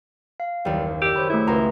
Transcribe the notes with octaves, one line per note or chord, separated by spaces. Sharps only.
F5
F#1 D#2 G3
G4 D5 E6
C5 C#5 B5
A3 E4 G4 G#4
C#2 F#4 A#5 C6